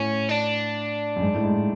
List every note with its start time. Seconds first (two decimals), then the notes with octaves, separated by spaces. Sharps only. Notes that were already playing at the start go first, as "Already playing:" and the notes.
Already playing: A2 C#4
0.29 D4
1.16 F#2
1.21 G#2
1.35 A2
1.44 G#2